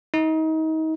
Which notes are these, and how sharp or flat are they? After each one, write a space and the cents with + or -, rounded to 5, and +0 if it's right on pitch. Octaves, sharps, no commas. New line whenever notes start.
D#4 +30